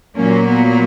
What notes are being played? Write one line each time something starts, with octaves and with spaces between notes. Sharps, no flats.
A#2 F#3 A#3 C#4
B3